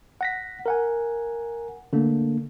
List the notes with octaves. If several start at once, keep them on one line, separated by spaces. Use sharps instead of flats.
F#5 A#6 B6
A#4 F#5 G#5
D3 A3 A#3 D4